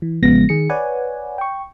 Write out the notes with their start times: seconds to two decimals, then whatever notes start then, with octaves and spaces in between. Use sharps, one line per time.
0.02 E3
0.23 A1 C#3 F3 G#3 B3 A#6
0.49 D#3 G#4 C#7
0.70 B4 C#5 D5 F#5 G#5
1.38 G5 C#6